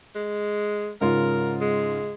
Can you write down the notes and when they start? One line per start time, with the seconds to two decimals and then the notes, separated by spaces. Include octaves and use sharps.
0.15 G#3
1.01 G#2 C#3 F4 A#4
1.61 G#3